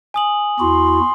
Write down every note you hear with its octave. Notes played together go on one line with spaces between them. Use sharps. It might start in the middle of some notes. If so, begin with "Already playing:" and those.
G#5 D#6 F#7
E2 E4 F#4 C6